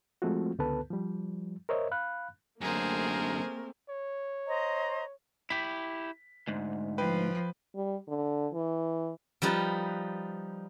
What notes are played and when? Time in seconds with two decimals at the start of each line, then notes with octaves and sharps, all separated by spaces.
0.22 F3 G#3 A3 C4 F4 F#4
0.59 C#2 D3 B3 A4 B4 A5
0.91 F3 G3
1.69 A#4 C5 C#5 D#5 E5
1.91 F5 B5 F#6
2.61 F#2 D3 A3 A#3 C4 G#4 A#4 C5
3.89 C#5
4.47 C5 D#5 A#5
5.50 E4 G4 B6
6.48 D2 G#2
6.98 F3 B4 G5
7.75 G3
8.08 D3
8.54 E3
9.42 F3 G3 D#4 B4